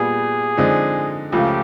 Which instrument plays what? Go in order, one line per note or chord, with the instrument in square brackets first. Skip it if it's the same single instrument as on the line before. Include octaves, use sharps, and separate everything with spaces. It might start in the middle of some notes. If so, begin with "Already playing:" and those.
Already playing: [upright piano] A#2 G3 B3 [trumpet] G#4
[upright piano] D3 F3 G#3 C4 D#4
[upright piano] C#2 C#3 F3 A3 [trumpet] G4